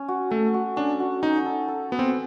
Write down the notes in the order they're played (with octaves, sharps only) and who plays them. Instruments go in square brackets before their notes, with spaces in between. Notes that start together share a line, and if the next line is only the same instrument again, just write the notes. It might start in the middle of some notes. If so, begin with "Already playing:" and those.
Already playing: [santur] C#4
F#4
[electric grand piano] A3 [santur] A4
[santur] F#4
[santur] C#4 [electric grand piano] D4
[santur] F#4
[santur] C#4 [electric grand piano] D#4
[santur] A4
A4
[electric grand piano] B3 [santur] F#4
[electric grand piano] C4